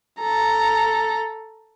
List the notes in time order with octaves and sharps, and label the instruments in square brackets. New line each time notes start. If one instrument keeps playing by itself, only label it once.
[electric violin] A4 A#5